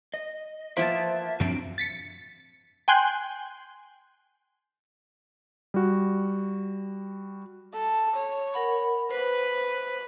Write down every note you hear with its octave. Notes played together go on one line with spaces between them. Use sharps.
D#5
F3 A#3 B3 C5 E5 A5
F#2 F3 F#3 C4 D4 F#4 D7
A6 B6 C#7
G5 G#5 C6 F#6 G6
G3 F#4
A4
C#5
A#4 F#5 B5
B4 C5